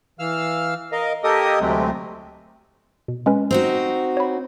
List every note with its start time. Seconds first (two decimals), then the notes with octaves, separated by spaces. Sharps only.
0.19 E3 F5 E6 F6
0.92 A#4 D#5 F5
1.24 A#3 G4 A4 A#4 D#5 D#6
1.60 D2 C3 F#3 G#3 A3 C4
3.08 B2
3.26 G#3 C#4 B4
3.51 C4 D#4 F#4
4.17 C#5 B5